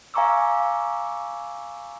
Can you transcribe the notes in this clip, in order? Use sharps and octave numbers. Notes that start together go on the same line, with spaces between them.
F5 G#5 A#5 C#6 D6 E6